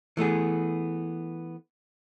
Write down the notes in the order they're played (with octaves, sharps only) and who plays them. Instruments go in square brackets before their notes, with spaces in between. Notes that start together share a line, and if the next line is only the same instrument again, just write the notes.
[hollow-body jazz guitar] E3 A3 B3 G#4